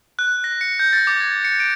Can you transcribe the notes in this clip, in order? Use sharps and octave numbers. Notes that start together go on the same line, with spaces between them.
F#6
A#6
C#7
G6
A6
D6
G#6
C#7
D7